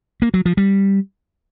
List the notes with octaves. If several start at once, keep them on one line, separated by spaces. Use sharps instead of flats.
A#3
F#3
F3
G3